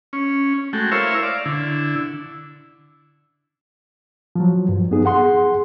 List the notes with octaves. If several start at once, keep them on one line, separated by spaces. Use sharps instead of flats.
C#4
G#3 A3 F#4 G5
E4 A#4 C5 C#5 E5 F5
D5 F5
D3 E4
F3 F#3
G2
B3 D#4 G#4
G#4 F#5 C6